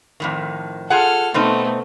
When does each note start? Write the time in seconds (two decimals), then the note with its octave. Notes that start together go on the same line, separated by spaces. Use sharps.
0.20 F2 A2 D#3
0.90 F4 G#4 A4 F#5 F6
1.34 B2 A3 B3 C4 D#4